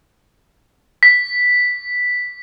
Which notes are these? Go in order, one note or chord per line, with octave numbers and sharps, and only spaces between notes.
B6